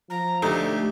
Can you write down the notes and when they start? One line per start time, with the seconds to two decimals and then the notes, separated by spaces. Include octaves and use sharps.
0.10 F3 A#5
0.42 D2 A3 D#4 G4